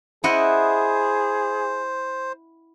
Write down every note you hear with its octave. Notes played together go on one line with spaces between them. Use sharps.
E4 G#4 C5 D#5 F#5